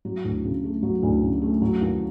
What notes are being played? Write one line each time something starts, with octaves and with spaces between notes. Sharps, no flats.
F#3
D2
C#3
A3
F#3
D2
C#3
A3
F#3
D#2